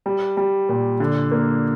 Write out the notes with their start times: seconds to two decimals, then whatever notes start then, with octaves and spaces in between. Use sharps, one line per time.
0.06 G3
0.37 G3
0.69 A#2
1.00 D3
1.32 A#3